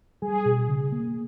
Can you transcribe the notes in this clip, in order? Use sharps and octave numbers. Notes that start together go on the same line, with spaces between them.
G3 G#4
B2
C#3
A#3